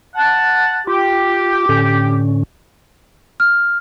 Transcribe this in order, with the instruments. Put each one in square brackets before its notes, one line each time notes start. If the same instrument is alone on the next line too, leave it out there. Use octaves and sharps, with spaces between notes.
[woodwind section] F#5 A5
[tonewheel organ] F4 [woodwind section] G4
[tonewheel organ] A2 D3 C#4
[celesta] F6